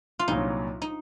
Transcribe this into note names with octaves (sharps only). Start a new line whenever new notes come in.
F4
C2 A#2 F#3 D#4
D#4